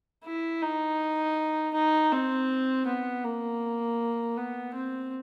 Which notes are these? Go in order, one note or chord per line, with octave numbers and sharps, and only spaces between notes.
E4
D#4
D#4
C4
B3
A#3
B3
C4